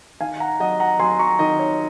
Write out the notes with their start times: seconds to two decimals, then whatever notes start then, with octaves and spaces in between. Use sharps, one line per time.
0.21 D#3 F5 G#5
0.40 F#5 A#5
0.60 F#3 D#5 F#5
0.80 F#5 A#5
0.99 F#3 G#5 C6
1.19 A#5 C#6
1.39 D#3 D#5
1.59 C#5